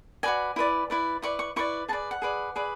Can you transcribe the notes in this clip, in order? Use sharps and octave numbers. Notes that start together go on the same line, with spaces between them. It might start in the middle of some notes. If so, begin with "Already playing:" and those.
F#4 B4 D5 G#5
E4 B4 D5
E4 B4 D5
E4 B4 D5 C#6
C#6
E4 B4 D5 C#6
G#4 B4 D5 A5
F#5
G#4 B4 D5
G#4 B4 D5